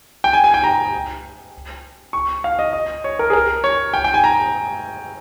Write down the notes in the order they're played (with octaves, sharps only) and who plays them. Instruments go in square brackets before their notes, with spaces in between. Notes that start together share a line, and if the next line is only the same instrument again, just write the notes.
[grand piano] G5
G#5
G#5
G5
A#5
C#6
F5
D#5
D#5
C#5
A#4
G#4
A#4
C#5
G5
G5
G#5
A#5